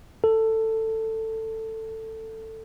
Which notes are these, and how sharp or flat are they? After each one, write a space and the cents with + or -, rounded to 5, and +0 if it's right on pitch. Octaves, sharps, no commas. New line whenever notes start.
A4 +15